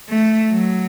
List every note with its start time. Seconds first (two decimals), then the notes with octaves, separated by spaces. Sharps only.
0.09 A3
0.51 F#3